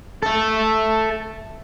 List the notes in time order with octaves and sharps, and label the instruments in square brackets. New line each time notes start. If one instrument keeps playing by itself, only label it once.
[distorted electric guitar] A4 E5